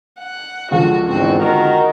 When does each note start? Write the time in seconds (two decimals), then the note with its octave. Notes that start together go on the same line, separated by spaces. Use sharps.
0.18 F#5
0.71 C#2 D3 F3 F#4
1.08 E2 G#2 C4 F#4
1.39 D#3 F#4 A#4